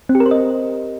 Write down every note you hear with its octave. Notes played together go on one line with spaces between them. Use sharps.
C4
G4
A#4
C5
D#5